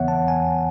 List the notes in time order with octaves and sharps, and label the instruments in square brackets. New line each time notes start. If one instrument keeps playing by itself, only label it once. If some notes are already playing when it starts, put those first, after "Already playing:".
Already playing: [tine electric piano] E2 C#3 E3 B3 C#5 E5 F#5
A5
G#5